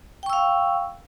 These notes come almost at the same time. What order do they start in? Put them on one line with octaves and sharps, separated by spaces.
G5 C#6 E6 F5